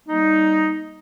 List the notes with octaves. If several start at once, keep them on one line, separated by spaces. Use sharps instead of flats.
G3 A#3 D#4